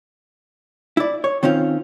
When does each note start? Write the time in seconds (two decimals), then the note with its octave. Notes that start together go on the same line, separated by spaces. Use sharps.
0.97 E4 D5
1.24 C#5
1.43 D#3 C4 C#4 F4